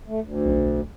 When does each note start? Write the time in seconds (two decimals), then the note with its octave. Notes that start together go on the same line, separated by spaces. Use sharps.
0.08 A3
0.22 D2
0.45 B1